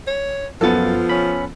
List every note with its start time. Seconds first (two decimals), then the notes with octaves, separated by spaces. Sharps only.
0.07 C#5
0.61 F#2 F3 B3 F4 A4 A6
1.09 C#4 B5